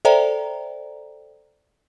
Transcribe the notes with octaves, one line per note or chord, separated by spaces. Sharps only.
A4 C5 D5 E5 G5 A#5